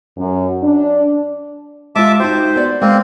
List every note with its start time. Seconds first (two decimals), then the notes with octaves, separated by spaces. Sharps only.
0.18 F#2
0.63 D4
1.96 G#3 F4 E5 A5 D6
2.20 D#4 F#4 C5 G5
2.56 B3 D5
2.81 G#3 A#3 C4